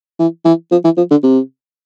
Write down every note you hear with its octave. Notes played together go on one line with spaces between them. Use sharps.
E3
E3
F3
E3
F3
D3
C3